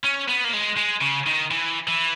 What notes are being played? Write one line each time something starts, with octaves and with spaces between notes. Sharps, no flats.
C#4
B3
A#3
G#3
G#3
C#3
D#3
E3
E3